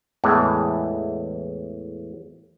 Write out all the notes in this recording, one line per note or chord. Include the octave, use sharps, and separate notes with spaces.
E2 A2 E3 G#3